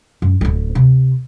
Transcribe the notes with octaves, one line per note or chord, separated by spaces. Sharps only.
F#2
D1 A3
C3